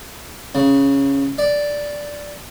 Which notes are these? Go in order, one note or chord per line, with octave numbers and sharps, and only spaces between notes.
C#3
D5